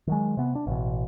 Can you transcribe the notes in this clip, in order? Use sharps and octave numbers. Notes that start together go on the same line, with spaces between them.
D#3 F#3 G#3
C3 B3
D4
A1 B2